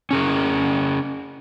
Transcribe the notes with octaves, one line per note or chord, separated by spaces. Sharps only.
C#4 G#4 A#4